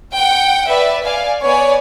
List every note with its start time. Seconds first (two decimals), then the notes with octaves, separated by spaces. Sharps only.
0.15 F#5 G5
0.69 B4 D5 E5
1.04 D5 F5 G#5
1.44 B3 C#5 D5 G#5